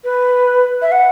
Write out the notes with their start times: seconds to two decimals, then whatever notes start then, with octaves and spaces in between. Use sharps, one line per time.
0.04 B4
0.82 E5
0.92 F#5